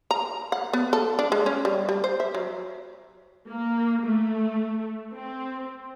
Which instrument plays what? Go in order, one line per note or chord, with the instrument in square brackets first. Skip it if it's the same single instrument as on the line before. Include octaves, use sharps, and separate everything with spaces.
[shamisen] A#5
F#5
B3
A4
D4
G#3
C#4
G3
G3
C5
E5
F#3
[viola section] A#3
A3
C4